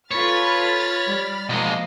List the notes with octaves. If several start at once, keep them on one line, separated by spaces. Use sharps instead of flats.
F4 A4 B4 C#5 B5 F6 A6
G3
B2 F3 G#3 A#3 D#5 F5